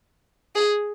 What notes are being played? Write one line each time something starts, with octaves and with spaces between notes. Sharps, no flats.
G#4